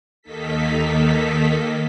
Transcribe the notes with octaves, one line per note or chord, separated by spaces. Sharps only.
D#2 D#3 A#3 D#4 A4 B6